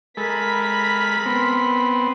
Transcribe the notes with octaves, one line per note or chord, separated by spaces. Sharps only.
G#3 A4 A#4 B5 B6
B3 C4